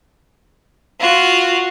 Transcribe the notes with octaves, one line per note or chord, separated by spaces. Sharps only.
F4 F#4